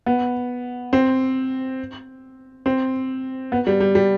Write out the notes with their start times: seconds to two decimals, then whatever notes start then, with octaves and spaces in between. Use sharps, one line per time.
0.06 B3
0.93 C4
2.66 C4
3.52 B3
3.67 G3
3.80 G3
3.95 G3